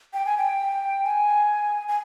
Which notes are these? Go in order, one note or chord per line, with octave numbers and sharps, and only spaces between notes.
G5
G#5
G5
G#5
G#5